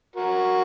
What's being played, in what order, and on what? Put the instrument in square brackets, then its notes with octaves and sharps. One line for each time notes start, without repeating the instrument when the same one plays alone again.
[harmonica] F#4 A#4